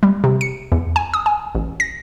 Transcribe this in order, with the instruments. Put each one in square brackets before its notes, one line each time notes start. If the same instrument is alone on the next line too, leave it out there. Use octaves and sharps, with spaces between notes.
[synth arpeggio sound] G3
C3
C#7
E2
G#5
D#6
G#5
A1
A#6